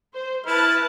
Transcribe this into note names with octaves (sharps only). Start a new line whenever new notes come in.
C5
E4 B4 A5 F6